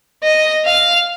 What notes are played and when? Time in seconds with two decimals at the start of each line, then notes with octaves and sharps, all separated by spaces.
0.24 D#5
0.65 F5